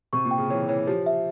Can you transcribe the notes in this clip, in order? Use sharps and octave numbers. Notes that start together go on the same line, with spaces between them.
C3 C#6
A#2
G5
C#3
E3 C#5
E3 C#5
F3 G4
E5